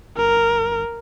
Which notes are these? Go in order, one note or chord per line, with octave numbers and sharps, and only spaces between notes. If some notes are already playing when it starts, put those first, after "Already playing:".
G1 A#4